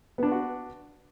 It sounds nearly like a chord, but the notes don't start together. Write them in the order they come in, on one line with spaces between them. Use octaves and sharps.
B3 D4 B4 F#4